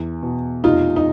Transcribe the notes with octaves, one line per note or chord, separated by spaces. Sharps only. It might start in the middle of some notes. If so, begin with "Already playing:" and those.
Already playing: E2
B2
F1 D#4 F4
D#4